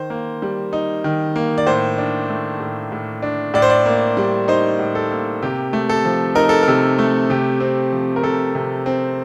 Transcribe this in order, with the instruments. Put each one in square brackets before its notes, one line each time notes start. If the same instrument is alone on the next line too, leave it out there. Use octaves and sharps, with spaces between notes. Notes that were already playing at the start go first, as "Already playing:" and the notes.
Already playing: [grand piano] D#3 C5
A#3
G3
D#4
D#3
A#3
D5
A2 C5
D4
A3
A2
A2
D4
A2 D5
C5
D5
A#3
G3
D#4 C5
A2
A4
A#3
C3 G4
A3
A4
F3
D#4 A#4
A4
C3 A#4
A3
C3 G4
C4
F3
A#4
C3 A4
C3
C4